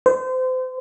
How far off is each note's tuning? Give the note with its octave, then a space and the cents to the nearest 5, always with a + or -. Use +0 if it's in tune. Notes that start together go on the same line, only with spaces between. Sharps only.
C5 -30